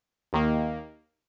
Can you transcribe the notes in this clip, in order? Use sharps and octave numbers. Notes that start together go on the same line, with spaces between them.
D#2 D#3 A#3